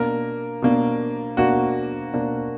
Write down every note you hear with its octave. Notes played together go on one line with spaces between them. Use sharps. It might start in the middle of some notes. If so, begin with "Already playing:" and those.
Already playing: B2 A#3 D4 A#4
B2 A#3 D4
B2 A#3 D4 F#4
B2 A#3 D4